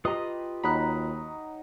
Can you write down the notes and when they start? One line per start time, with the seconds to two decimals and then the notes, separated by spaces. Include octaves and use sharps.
0.05 F4 G4 B4 D#5 A#5 D#6
0.63 D#2 F#3 D#4 D#5 B5 F#6